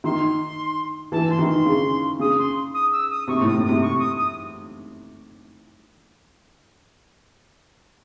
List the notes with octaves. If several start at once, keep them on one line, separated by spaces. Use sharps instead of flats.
D#3 C6
E3 A5
C6
D#3
C6
C#3
C#3 D#6
C6
D#6
E6
D#6
C3 C#6
A2
D#6
A2
D#6
C3
C#6
D#6
D#6